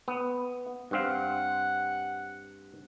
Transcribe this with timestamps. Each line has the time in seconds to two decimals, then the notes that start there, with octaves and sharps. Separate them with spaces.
0.08 B3
0.91 G2 C4 F5 F#5